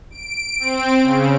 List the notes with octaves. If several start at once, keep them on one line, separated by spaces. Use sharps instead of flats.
D7
C4
C#3